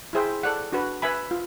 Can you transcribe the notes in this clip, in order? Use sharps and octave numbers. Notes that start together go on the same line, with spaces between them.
E4 G#4 C5 E5 G5
A4 D5 F#5
D4 F#4 B4
B4 E5 G#5 B5
F4